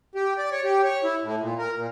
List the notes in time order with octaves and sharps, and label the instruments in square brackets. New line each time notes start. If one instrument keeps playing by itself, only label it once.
[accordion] G4
D5
C#5
G4
C#5
E4
A2
A#2
A#4
A#2